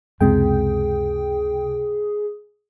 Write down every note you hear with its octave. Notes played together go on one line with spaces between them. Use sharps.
C#2 F#2 C3 G#3 C4 G#4 G5